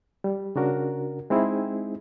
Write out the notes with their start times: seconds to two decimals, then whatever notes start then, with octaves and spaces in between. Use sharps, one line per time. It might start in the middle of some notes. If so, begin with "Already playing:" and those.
0.24 G3
0.56 C#3 D4 F#4 A#4
1.30 G#3 C4 D#4 E4 G#4